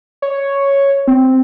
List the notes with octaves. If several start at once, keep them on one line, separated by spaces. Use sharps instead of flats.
C#5
C4